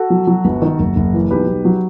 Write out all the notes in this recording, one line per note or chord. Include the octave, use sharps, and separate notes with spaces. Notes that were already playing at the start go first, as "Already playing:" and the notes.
Already playing: F#4 A4
F#3
F#3
G1
D#3
F#1
F#1
E3
B1 G4 B4
B1
F#3